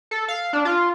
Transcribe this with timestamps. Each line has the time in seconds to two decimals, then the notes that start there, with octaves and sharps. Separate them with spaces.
0.11 A4
0.28 F5
0.53 D4
0.65 F4